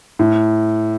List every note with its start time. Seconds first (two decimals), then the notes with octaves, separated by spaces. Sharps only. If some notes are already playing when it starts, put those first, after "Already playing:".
0.19 A2